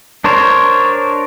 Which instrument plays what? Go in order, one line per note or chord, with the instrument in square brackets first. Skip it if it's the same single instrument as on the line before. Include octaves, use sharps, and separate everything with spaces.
[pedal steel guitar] D4 A#4 C5 C#5